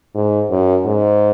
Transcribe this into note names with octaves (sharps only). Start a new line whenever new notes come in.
G#2
F#2
G#2